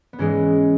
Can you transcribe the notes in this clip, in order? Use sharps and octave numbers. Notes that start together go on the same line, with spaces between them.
B3
G#2 E3 G#3 C#4